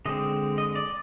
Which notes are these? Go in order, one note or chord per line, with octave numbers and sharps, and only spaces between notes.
D3 G#3 C4 D#5
D#5
D5